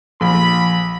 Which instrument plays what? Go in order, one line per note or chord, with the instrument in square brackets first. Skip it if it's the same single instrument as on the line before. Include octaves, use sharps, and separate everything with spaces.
[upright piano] A#1 [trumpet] B5